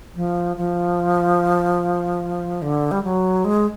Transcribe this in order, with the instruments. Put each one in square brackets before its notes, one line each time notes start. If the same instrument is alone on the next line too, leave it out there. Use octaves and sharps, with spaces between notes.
[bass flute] F3
F3
D3
G3
F#3
G#3